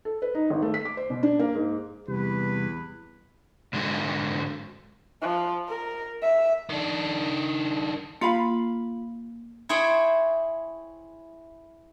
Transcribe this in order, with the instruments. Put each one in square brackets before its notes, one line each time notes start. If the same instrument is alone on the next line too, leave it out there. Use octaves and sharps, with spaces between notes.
[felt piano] A4
B4
D#4
G#1
A3
B6
D6
C5
B2
D4
A#3
G#2
[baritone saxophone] E2 [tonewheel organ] C3 G3 [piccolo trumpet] B4
[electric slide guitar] G#2 D3 G#3 F#4
[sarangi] F3
A#4
E5
[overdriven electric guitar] D#3 D4
[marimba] A#3 [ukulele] F4 F5 B5
[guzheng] E4 G#4 C5 C#5 G5